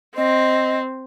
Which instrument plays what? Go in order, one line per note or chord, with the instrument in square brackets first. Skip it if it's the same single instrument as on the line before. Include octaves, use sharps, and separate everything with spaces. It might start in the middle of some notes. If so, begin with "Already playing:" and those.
[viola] C4 [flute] D#5